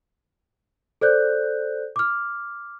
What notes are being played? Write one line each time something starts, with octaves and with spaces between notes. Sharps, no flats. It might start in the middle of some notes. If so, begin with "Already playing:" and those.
A4 C5 D5 F#6 G6
D6 F6